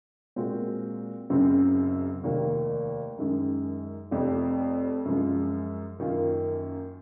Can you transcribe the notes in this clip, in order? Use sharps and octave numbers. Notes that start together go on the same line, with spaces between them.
A#2 G#3 C4 F#4 A#4
F#1 F#2 C#3 F#3 C4
F1 D#2 D#3 A#3
F#2 D#3 G#3 D#4
F1 F2 C3
F#2 F3 G#3
F#2 D#3 A#3 C#4 F4